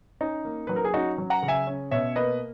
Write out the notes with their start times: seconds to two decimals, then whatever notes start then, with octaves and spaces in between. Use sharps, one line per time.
0.21 C#4 D#4
0.45 A#3
0.67 F#3 B4
0.76 A#4
0.84 G#4
0.94 C#4 D#4 F#4
1.18 F#3
1.30 F#5 A#5
1.43 C#3
1.48 E5 G#5
1.67 C#4
1.91 B2 C#5 E5
2.16 A#3 B4 D#5